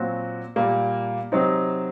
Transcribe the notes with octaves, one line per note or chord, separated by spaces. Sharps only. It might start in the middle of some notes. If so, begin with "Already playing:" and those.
Already playing: A#2 F#3 C4 F#4
A#2 G3 A#3
C3 F#3 C4 D#4